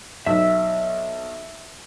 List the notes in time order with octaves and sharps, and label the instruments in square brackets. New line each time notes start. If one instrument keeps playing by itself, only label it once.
[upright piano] B1 [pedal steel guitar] E5 E6